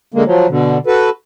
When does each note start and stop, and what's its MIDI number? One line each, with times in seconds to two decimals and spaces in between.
0.14 0.23 50
0.14 0.23 56
0.14 0.23 58
0.25 0.47 53
0.25 0.47 54
0.49 0.78 47
0.49 0.78 50
0.87 1.10 66
0.87 1.10 69
0.87 1.10 71